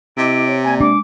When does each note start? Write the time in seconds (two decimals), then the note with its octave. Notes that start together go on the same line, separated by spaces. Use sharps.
0.17 C3 E4 D#5 D6 D7
0.47 C#5
0.64 A#3 D5 G#5
0.80 G#3 D4 D6